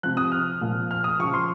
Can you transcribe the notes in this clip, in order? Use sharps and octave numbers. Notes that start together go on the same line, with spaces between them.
C3 F3 F#6
D#6
F6
A#2 F3
F6
D#6
C#3 F3 C#6
C6